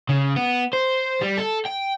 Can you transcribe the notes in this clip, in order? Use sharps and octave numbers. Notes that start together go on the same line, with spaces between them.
C#3
B3
C5
G3
A4
G5